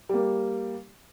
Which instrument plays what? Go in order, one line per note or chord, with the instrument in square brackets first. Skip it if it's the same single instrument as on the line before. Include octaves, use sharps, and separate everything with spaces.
[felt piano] G3 A#3